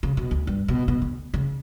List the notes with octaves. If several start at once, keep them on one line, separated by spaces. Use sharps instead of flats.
C#3
B2
D2
G2
B2
B2
D2
C#3